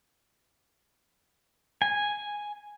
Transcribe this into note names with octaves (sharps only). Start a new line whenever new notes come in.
G#5